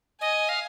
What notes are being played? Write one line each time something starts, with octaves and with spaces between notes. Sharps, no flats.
D#5 G#5
F5